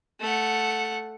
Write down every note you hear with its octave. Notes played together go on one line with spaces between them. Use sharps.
A3 F#5